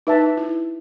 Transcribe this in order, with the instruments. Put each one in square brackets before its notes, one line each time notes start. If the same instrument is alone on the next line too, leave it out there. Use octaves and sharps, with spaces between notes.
[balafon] D#4 [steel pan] B4 E5 A5
[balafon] E4